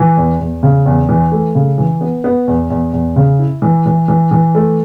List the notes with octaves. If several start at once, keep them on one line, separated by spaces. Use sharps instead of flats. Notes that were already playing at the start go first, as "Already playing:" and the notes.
Already playing: E3
E2
E2
C#3
E2
E3
A3
C#3
E3
B3
B3
E2
E2
E2
C#3
E4
E3
E3
E3
E3
A3